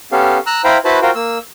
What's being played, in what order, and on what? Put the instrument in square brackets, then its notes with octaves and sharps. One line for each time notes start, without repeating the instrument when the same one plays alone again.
[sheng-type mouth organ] B3 C#4 G4 A4 F5
A#5 E6 F#6
E4 C5 F5 G5 A#5 B5
E4 F#4 B4 C5 A5 B5
F4 F#4 A#4 C5 F5 G5
A#3 E6